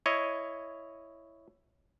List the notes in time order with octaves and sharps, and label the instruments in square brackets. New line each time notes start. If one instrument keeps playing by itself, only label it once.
[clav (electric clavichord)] E4 C#5 D#5